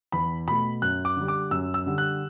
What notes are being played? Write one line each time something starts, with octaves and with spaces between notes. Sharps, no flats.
E2 B5
B2 A3 B5
F#2 F#6
D6
D3 G3
D6
F#2 E6
E6
D3 G3
F#6